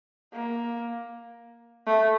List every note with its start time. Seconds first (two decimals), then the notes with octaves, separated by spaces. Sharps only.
0.33 A#3
1.87 A3